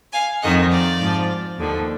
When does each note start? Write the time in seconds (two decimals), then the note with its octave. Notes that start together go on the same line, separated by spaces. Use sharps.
0.12 F5 G#5
0.42 F2 D#3 D#5 F#5
0.70 D5 F5
1.00 G#2 F3
1.57 D#2 D3 F3